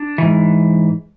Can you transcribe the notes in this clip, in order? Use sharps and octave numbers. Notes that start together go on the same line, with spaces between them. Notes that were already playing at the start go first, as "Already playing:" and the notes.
Already playing: D4
G#2 E3